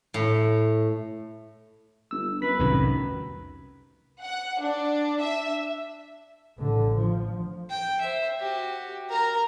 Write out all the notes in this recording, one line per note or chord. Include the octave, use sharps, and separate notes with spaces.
A2
G1 E6
F#2 B4 B6
C2 F2 A2 D#3
F#5
D4
E5
A1 D3
F3
G5
C5 E5
F#4 G4
A#4 A#5